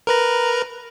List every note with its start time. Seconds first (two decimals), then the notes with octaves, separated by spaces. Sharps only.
0.07 A#4 B4 A#5